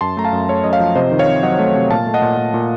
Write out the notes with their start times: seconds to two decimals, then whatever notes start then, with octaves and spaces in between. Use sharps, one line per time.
0.01 F#2 A5 C6
0.17 A3 A#5
0.25 F5 A5
0.33 F#2
0.49 A3 C#5
0.64 F#2 D#5
0.72 C#5 F5
0.80 F3
0.95 C3 C5 D#5
1.11 D#3
1.19 C#5 F5
1.27 C3
1.43 F#3 D#5 F#5
1.59 A3
1.75 C3
1.90 A#2 F5 A5
2.06 A3
2.14 D#5 F#5
2.22 A#2
2.37 A#2
2.54 A#2